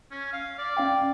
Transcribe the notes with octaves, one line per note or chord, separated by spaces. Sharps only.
C#4
F5
D5
C#4 F5 G5